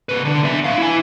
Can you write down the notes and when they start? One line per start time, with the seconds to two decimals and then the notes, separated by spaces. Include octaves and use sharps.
0.09 C3 B4
0.25 D3 D4
0.44 B3 E5
0.64 D4 F5
0.78 E4 G#5